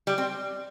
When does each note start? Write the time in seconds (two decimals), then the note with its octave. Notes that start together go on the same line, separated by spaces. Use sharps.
0.07 G3
0.18 C4